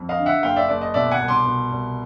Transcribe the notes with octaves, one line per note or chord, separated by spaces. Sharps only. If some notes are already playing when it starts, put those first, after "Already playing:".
Already playing: F2
D#5 F5
D3
E5 F#5
F#1 F5 G5
D5 E5
F#1 D5
D#5
B2 D5 E5
F#5 G#5
C2
C6 D6
B2
C2